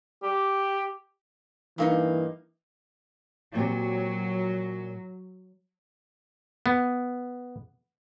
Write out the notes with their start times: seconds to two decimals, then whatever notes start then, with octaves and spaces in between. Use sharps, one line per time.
0.23 G4
1.78 G2 E3 A#3 D#4
3.55 A#2 F#3 C4 G4
6.66 B3